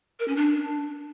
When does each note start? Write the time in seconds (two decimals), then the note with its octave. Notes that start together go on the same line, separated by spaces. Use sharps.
0.20 A#4
0.28 C#4
0.36 D4